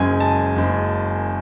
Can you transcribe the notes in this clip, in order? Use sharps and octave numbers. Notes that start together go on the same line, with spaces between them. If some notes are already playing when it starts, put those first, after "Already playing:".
Already playing: F#1 F#2 C#3 G#3 G#5
A5
F#1 F#2 C#3 G#3